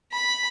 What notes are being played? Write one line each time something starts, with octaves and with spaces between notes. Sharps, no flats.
B5